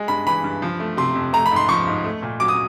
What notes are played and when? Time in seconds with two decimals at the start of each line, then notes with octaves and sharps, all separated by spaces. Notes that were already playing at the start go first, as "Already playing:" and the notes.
Already playing: G#3
0.08 G2 B5
0.26 E3 B5
0.44 G2
0.62 F3
0.80 A3
0.97 C3 C6
1.15 F2
1.33 A3 A#5
1.46 B5
1.51 G#2
1.56 C6
1.69 F3 C#6
1.87 G#2
2.04 A3
2.22 A#2
2.40 F#3 D6
2.48 D#6